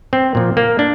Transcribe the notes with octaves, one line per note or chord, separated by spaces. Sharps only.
C4
A#2 F3
A#3
D4